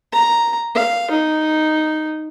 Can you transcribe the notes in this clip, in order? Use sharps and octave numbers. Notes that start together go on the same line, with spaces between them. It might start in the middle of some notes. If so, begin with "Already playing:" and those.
A#5
F5
D#4